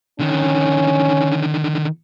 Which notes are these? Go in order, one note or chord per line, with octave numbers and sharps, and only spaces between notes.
D3 D#3 C#4